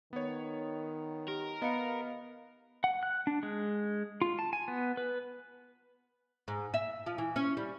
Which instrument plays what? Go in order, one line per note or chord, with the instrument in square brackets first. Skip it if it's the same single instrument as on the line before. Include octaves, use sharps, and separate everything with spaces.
[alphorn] D#3 [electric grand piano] B3 C#5
[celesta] G4 [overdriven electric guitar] A#4
[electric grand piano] B3 F5 [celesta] D#5 B5 C#7
[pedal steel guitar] F#5
F#6
D4
G#3
F4
A5
G#5
B3
B4
[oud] G#2
E5
F3
E3
C#4
G3